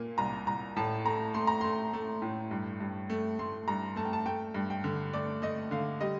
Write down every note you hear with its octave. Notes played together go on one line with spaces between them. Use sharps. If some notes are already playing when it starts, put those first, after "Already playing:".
Already playing: A#2 A#3
C2 A#5
C2 A#5
A2 A5
A3 A#5
A3 C6
A#5
A3 C6
A3
A2
G2
G2
A3
A3 C6
G2 A#5
A3 A5
G5
A5
A3 G5
G2
G5
D3
A3 D5
A3 D#5
D3 F5
G3 D#5